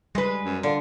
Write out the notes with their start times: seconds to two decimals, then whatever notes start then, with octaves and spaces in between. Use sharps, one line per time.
0.15 G3 G#3 B4
0.43 F#2
0.63 D3 F4